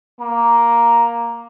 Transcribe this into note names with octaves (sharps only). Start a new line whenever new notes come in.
A#3 A#5